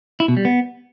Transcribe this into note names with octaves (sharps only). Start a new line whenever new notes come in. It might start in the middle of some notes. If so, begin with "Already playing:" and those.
E4
B2
G3
B3